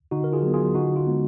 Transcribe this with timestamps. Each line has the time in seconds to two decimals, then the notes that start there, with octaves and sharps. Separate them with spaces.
0.11 D3 D#4 F#4
0.24 A#4
0.33 F4 G#4
0.43 F#3 B3
0.54 F4 G#4
0.74 D3 D#4 F#4
0.96 F4
1.07 G#3 B3